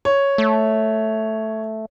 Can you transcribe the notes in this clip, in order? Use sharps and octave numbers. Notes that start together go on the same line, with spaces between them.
C#5
A3